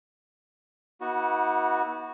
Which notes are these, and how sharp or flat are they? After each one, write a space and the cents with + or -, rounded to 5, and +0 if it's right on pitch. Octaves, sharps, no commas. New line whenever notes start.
B3 -30 D#4 +45 F#4 +0